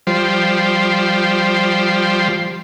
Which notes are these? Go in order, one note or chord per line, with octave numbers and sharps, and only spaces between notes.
F3 G3 C5